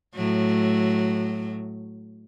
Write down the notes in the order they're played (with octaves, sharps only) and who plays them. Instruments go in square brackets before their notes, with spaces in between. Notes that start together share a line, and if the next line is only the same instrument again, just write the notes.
[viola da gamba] A2 F#3